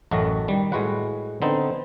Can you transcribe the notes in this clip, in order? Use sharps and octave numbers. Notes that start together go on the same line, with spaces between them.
A1 F#2 F#3 A3 F#4 D#5
D#3 G3
A2 G#3 F#4 B4 F#5
D3 B3 C4 D#4